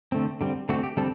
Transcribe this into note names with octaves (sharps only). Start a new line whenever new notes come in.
D3 A3 C4
D3 G3 C4
D3 A3 C4 F#4
G4
D3 G3 C4 A4